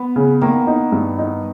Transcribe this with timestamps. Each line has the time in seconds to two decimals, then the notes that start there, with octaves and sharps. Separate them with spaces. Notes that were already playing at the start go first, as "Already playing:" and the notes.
Already playing: B3
0.16 C#3
0.41 D#3 A#3
0.67 D#4
0.92 G2
1.18 D#4